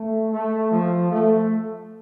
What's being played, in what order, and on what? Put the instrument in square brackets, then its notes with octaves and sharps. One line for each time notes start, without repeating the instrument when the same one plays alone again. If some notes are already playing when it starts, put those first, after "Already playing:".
Already playing: [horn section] A3
A3
F3
A3